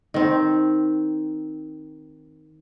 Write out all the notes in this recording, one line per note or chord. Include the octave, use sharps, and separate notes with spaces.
D#3 C4